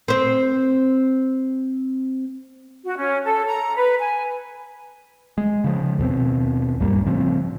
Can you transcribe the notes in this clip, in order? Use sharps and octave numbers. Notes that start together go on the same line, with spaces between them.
C4 C5
F#4
C#4
A4
A#5
B4
G#5
G#3
C#3 F3
D#2 B2 C4
B1 G2 G3 A#3
A2 C#3 F3 C4